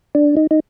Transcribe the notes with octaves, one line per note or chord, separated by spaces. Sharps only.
D4
D#4
D#4